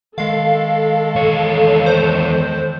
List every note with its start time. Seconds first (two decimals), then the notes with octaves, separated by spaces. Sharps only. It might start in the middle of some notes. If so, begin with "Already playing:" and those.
0.18 D#3 G#3 A4 F5
1.16 E2 C#5
1.86 C5